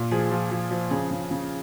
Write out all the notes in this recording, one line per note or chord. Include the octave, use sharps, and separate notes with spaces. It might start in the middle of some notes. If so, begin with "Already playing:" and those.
Already playing: A#2
F3 G#4
F3
F3
F3
C#3 G#4
C#3
C#3